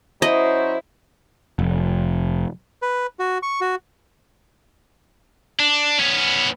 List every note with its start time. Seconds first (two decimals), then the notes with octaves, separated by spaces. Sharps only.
0.22 F#3 C#4 E4 C5 D#5
1.59 F1
2.82 B4
3.19 F#4
3.43 C#6
3.61 F#4
5.59 D4
5.99 B3 C#4